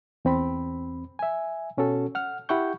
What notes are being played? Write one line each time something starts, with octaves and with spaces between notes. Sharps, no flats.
E2 C4 B5
E5 G#5
B2 C#4 F#4 A4
F#5 F6
E4 G4 F#5 G5 C#6 G6